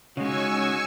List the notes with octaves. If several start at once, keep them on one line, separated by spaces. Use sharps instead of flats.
C#3 G#3 C#4 D#4 F#4 G#5 C#6 E6